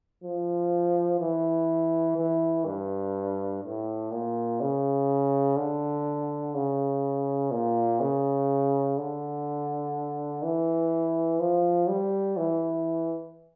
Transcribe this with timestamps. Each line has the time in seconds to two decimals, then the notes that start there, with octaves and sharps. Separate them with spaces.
0.24 F3
1.20 E3
2.17 E3
2.65 G2
3.63 A2
4.12 A#2
4.61 C#3
5.57 D3
6.55 C#3
7.51 A#2
8.00 C#3
8.98 D3
10.43 E3
11.40 F3
11.89 G3
12.37 E3